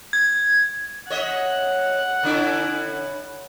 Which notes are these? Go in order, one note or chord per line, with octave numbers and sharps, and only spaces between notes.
G#6
C#5 D#5 E5 F#5
D3 C#4 E4